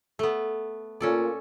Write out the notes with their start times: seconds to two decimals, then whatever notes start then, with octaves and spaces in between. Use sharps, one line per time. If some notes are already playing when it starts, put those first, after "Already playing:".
0.19 A3 B3
1.00 A#2 C#4 A4 D5